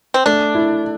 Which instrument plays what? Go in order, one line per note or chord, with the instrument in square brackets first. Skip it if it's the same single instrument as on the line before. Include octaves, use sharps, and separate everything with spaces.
[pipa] C4
[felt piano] A3 [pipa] D4
[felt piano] E4